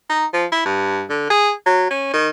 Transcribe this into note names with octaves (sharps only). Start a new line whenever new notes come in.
D#4
F3
E4
G2
D3
G#4
F#3
C#4
D#3